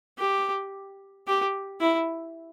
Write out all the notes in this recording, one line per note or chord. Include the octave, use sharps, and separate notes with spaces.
G4
G4
E4